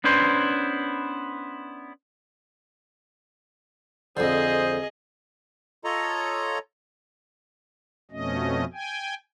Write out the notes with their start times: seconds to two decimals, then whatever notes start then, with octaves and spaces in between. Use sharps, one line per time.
0.04 B3 C#4 D4 E4 B4 C5
4.17 F2 D3 G#4 C5 D#5
5.84 F4 A4 C#5 D#5 A#5
8.11 F2 B2 A3 C#4 D#5
8.73 G5 G#5